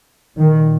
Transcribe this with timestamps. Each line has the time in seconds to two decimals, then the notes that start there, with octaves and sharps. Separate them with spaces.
0.38 A#2 D#3